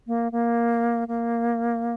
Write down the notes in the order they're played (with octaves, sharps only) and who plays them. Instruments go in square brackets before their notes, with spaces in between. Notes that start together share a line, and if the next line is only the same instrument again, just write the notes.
[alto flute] A#3
A#3
A#3